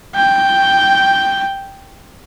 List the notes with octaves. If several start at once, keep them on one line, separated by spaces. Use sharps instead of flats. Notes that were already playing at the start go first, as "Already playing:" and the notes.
G5